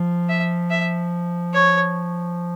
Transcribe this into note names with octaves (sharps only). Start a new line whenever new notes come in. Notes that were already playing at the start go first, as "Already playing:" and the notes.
Already playing: F3
E5
E5
C#5